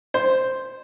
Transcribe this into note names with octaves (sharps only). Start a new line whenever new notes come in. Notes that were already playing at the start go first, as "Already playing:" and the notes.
C5